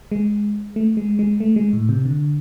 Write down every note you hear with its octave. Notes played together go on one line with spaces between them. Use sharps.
G#3
A3
G#3
G#3
A3
G#3
A2
C3
D3